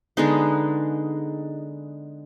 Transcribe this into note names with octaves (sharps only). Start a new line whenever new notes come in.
D3 G#3 B3 D#4